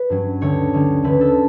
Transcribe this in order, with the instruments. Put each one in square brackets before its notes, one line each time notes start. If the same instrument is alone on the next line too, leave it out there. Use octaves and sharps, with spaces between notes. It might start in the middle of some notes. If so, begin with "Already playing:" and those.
Already playing: [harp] B4
G2 F#3 C#4
D2 D3 G3 C#4 C#5
D2 D3 G3 C#4
D2 D3 A3 C#4 B4
A4